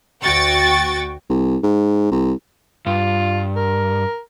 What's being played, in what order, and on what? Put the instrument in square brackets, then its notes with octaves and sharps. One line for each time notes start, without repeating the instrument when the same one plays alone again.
[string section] D2 F#4 G5 C#6 A6
[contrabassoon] C2
G#2
C2
[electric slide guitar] G2 [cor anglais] F4
[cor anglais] A#4